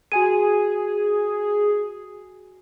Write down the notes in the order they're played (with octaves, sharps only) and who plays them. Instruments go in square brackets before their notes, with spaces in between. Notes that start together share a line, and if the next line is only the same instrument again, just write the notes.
[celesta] F#4 G#5 D#7 [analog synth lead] G#4